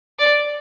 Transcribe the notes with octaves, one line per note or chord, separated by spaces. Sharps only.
D5